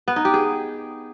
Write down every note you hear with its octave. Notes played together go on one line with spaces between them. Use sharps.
B3
D#4
G4
G#4